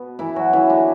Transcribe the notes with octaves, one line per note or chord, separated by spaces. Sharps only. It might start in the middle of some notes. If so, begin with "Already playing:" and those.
Already playing: B2 B3
E3 E4
F#3 F#4
E3 E4
D3 D4